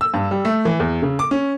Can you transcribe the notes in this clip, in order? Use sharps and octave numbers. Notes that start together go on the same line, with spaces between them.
E6
G2
G3
A3
E3
E2
C#3
D6
C#4